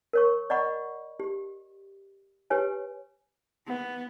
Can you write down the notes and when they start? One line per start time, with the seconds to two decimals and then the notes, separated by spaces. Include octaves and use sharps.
0.13 A#4 C#5 C#6
0.50 D5 D#5 F#5 B5 C#6
1.20 G4
2.50 G4 B4 C#5 G#5
3.67 B3